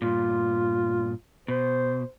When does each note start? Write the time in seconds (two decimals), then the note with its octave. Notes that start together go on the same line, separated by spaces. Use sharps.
0.02 G2 A#2 F4
1.48 B2 C5